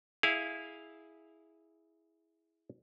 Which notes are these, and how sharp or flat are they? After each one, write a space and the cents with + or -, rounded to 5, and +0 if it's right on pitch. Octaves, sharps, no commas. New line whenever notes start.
E4 -10 G#4 +0 F5 +0